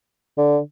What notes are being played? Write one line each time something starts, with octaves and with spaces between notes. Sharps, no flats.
D3